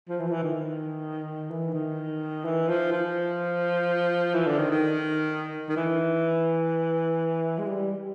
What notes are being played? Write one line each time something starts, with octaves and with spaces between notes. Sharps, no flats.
F3
E3
F3
E3
D#3
E3
D#3
E3
F3
F3
E3
D3
D#3
D#3
D#3
E3
G#3
G3